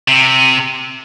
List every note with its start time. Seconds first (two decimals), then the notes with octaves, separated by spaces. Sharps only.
0.08 C3